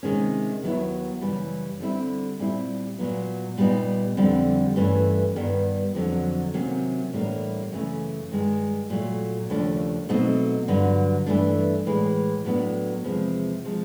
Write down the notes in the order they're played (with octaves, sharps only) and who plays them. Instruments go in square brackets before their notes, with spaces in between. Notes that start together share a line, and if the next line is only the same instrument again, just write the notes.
[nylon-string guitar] C3 D#3 G#3 C#4
D#2 D#3 F#3 B3 E4
F#2 C#3 E3 G3
D3 G3 C4 E4
A#2 G3 C4 E4
A#2 F#3 B3
A#2 G3 B3 D#4
F2 D3 G3 C4
G2 E3 A3 C#4
G2 D#3 G3 B3
F2 D3 F#3
C3 D#3 F#3 A#3 C#4
A2 E3 G3 A#3 D4
F#2 C#3 E3 A3 C#4
G2 D#3 G#3
A#2 F#3 A3
D#2 C#3 F3 A3 D4
B2 F#3 A3 C4 D#4
G2 D3 F#3
G2 E3 A3 D4
A2 E3 G#3
A2 F#3 B3 D4
E2 C3 F3 G#3
C3 F3 G#3